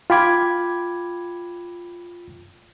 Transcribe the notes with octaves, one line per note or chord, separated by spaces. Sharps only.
F4 G5 B5 D6 G#6